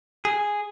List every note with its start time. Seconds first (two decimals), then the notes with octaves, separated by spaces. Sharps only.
0.25 G#4